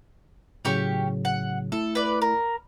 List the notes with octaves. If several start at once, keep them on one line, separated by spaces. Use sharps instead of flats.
A2 C#3 F#3 C#4 G4 C#6
F#5
A3 E4 A4
B4 D5
A#4